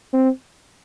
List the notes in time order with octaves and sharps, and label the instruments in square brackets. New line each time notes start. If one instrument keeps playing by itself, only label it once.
[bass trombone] C4